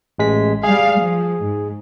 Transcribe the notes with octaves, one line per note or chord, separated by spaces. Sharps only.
A1 G#3 B6
G3 G#4 F5
F3
G#2